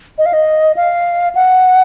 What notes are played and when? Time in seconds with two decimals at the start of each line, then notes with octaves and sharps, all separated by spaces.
0.18 D#5
0.26 F5
0.33 D#5
0.77 F5
1.35 F#5